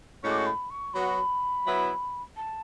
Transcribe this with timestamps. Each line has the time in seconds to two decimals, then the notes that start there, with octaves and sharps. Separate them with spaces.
0.22 A2 G#3 C#4 F#4 C#6
0.31 D6
0.38 C#6
0.46 B5
0.70 C#6
0.94 F#3 B3 F#4 B5
1.65 F#3 B3 E4
2.37 A5